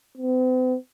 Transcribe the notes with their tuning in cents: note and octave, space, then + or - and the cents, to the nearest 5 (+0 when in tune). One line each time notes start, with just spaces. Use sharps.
C4 -45